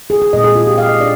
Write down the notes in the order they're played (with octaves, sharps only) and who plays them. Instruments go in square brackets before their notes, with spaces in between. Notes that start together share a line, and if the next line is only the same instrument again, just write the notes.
[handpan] G#4
G#4
A#2 G#3 C4 D#5
G#4
F4
G4
F5
D#5
D4 D5